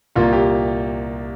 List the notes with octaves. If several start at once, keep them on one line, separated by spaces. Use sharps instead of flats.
C2 A#2 A#3 F4
G4